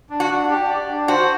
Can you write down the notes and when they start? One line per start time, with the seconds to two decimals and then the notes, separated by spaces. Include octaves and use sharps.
0.10 D4
0.20 F#4
0.30 D4
0.50 G4
0.69 D5
0.89 D4
1.08 F#4 C5